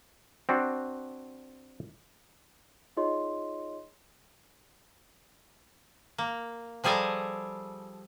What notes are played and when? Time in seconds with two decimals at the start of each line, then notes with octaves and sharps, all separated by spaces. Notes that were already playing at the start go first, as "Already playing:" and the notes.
0.49 C4 D4 F#4
2.97 D#4 F4 G#4 C#5 D#5 C6
6.18 A#3
6.84 F3 G3 G#4 A4 G#5 A#5